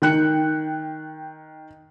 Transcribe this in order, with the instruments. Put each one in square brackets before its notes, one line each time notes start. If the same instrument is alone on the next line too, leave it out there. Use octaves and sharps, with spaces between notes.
[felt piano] D#3 G5 F#6 C#7